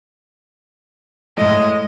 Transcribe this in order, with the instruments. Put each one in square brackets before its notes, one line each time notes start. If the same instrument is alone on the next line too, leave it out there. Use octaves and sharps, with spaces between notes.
[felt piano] A2 A3 [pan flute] G#3 [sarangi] D#5